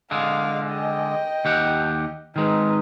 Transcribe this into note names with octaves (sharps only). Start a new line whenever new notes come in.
D3 G#3 F5
D#5 G5
D#2 G4 F#5
D#3 G#3 D#4 B4